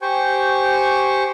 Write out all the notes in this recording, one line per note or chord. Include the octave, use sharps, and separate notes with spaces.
G4 C5 G5 G#5 C#6